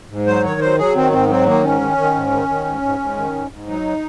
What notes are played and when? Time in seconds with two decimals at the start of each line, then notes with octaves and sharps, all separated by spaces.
0.10 G#2
0.27 F#3 C5
0.44 D#3 C#5
0.61 F#3 C5
0.78 F#3 G#4
0.95 D#3 C4
1.12 G#2 C4
1.29 F#3 C4
1.46 D#3 A#3
1.63 G#2 C#4
1.81 D#3
1.98 D#3
2.15 G#2
2.32 D#3
2.48 D#3
2.65 G#2
2.82 G#2
3.00 G#2
3.17 D#3
3.34 G#2
3.51 G#2
3.67 F#3 D#4